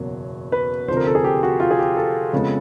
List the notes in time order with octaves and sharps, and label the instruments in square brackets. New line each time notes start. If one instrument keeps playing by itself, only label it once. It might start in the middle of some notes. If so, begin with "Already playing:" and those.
Already playing: [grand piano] F#1 E2 B2 F#3 A#3
B4
F1 F2 D3 F3 C5
A#4
A4
G#4
G4
F#4
F4
G#4
G4
A4
F2 C#3 F3 G#3 B3